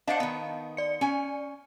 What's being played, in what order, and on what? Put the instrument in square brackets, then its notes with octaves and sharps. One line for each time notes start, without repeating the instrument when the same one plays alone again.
[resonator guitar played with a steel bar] D4 C5 F#5 [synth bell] D#5 F5 A5
[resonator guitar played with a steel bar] D#3 B3
[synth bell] D5 C#7
[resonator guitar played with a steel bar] C#4 G#5